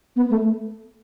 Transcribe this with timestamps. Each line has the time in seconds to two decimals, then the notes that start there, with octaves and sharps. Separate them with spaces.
0.16 B3
0.30 A3